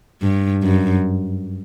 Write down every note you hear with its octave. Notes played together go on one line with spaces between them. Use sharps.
G2
F#2